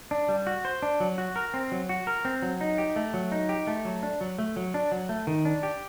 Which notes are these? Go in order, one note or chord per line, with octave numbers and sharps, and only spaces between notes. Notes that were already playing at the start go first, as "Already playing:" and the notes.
D4
G3
F#4
C5
D4
F#3
F#4
A#4
C4
F#3
F#4
A#4
C4
F#3
D#4
G4
A3
F#3
D#4
G4
A3
F#3
D4
F#3
A3
F#3
D4
F#3
A3
D#3
D4
G4